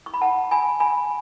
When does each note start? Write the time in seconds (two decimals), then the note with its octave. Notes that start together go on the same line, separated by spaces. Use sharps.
0.06 C#6
0.14 B5
0.21 F#5 A5
0.51 G#5 B5
0.80 G#5 B5